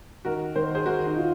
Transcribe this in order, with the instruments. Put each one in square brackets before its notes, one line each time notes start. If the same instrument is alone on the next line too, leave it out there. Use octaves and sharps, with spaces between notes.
[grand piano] D#3 [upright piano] F#4 A#4
[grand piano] D#3 [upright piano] C5
[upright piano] G#4 C5
[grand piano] D#3 [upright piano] F#4 A#4
[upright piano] D#4 F#4
[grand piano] F4